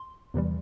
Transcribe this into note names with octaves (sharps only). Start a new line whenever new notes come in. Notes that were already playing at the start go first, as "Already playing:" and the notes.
Already playing: C6
E2 C3 E3 G3